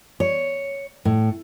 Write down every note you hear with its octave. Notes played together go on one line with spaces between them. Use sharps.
C#5
A2